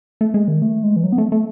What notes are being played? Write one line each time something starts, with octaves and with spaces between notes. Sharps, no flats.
A3
G#3
D#3
A3
G#3
E3
F#3
B3
A3
A3